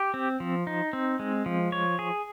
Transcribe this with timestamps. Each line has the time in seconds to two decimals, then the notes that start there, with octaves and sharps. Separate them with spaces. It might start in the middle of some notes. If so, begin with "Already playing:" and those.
Already playing: G4
0.14 C4
0.40 F3
0.67 D#4
0.93 C4
1.19 G#3
1.46 F3
1.72 C#5
1.99 G#4